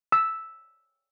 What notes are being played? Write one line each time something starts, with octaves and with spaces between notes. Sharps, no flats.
E6